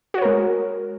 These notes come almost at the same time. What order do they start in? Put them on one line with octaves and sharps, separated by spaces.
F#4 C#5 A#4 G#3